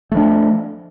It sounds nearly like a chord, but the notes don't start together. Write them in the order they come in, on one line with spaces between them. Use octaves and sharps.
A3 F3 D4